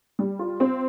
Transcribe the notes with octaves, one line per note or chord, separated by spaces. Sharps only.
G3
F4
C4